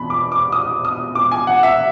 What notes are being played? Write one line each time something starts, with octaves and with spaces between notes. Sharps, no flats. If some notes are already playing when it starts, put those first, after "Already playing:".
Already playing: E2 B2 B5
D6
D6
D#6
D#6
D6
G#5
F#5
E5